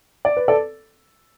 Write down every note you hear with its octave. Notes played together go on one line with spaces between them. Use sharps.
D5
B4
A4 D5